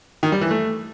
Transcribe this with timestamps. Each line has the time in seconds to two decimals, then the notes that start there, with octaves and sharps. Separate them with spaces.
0.23 D#3
0.32 G3
0.41 E3
0.51 A3